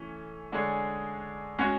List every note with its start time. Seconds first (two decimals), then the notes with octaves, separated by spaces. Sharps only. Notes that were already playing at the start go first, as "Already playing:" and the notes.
Already playing: E3 A3 C#4
0.52 D3 G#3 D4 G#4 C#5
1.58 G#3 C#4 F#4 C#5